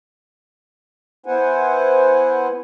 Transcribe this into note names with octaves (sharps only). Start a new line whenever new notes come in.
B3 E4 C5 F#5 G#5